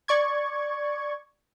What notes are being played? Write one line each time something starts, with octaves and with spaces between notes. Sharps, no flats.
D5 C#6 G#6